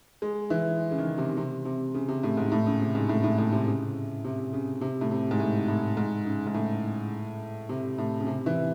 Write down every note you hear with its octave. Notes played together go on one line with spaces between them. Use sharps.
G#3
E3
C#3
D#3
C3
C3
C3
C#3
C3
A2
G#2
A2
C#3
C3
G#2
A2
A2
A2
C3
C#3
C3
C#3
C3
A2
C3
G#2
A2
A2
G#2
C#3
G#2
A2
C3
A2
C#3
C3
E3